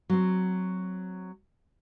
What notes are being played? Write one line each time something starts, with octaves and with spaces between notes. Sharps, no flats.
F#3 C4